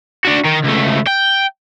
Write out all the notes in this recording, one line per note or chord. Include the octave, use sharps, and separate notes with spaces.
D4 F#4
D#3
C#2 A3
G5